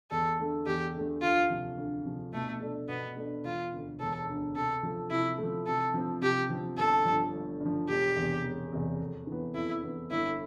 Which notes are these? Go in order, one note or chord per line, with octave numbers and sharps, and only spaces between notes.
E2 A4
D3 A3
E2 G4
D3 A3
D2 F4
C3 F3
D2
C3 F3
B2 A3
A3 D4
B2 B3
A3 D4
E1 F4
D2 D3
E1 A4
D2 D3
C3 A4
F3 A3
C3 E4
A3
F3
C3 A4
F3 C4
C3 G4
F3 C4
G1 A4
G2 F3
G1
G2 F3
E1 G4
E2 C3
E1
E2 C3
F2
E3
B3
F2 E4
E3 B3
G1 E4